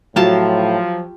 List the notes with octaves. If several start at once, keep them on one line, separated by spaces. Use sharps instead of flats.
A2 F3 F#3 F4 G4 A5